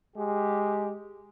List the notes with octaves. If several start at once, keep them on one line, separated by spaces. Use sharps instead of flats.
G#3 G4